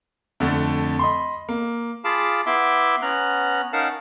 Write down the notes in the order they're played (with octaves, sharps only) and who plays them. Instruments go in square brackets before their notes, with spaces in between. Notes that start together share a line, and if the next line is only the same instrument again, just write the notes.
[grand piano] F2 D3 A3
D#5 B5 C6
A#3
[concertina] F4 G#4 F5 A5 B5 D6
B3 E4 E5 C6 D6
B3 C#4 A#5 F#6
C#4 D#4 A#4 F5 F#5 A5